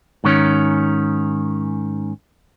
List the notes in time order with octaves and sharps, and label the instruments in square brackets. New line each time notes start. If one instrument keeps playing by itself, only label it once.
[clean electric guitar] G#2 D#3 C#4